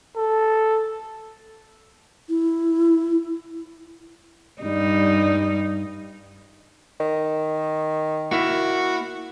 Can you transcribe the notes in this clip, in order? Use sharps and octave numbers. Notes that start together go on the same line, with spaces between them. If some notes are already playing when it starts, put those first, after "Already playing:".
A4
E4
G2 G3 D#4
D#3
A#3 E4 F#4